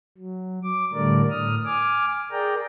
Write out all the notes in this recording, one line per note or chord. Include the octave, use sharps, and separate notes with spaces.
F#3
D6
A2 D3 G3 A3 A#4 D5
A2 D#6 F6
G#5 D6 F6
G#4 A#4 D5 G5 A#5